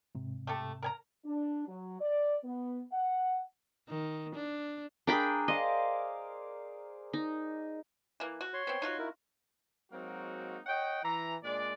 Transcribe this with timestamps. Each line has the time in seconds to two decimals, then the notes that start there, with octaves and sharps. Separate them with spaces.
0.15 G#2 C3
0.47 A3 G4 A4
0.83 A#4 G#5 A#5
1.24 D4
1.67 F#3
2.00 D5
2.43 B3
2.92 F#5
3.89 D#3
4.35 D4
5.07 D4 G#4 A#4 G5 B5
5.48 C5 D5 D#5 F5
7.13 D#4
8.20 E3 A#3
8.41 F#4
8.54 C#5 C6
8.67 B3 C4
8.82 D#4 F4 F#4
8.99 E4 A#4
9.91 F#3 G#3 A#3 C4 D#4 F#4
10.66 C#5 D#5 F#5 G5
11.03 E3 A#5
11.43 A#2 G#3 D4 D5